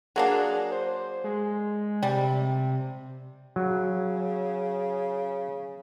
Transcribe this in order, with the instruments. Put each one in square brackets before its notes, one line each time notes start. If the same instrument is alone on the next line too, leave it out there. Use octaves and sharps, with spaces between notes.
[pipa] F#3 A#3 D4 [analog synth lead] G#4
[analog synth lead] C5
G#3
[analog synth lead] C3 [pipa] G3
[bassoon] C#3 [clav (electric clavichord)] F#3